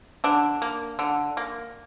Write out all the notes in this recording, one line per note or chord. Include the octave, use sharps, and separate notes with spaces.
D3 D4
A#3
D3
A#3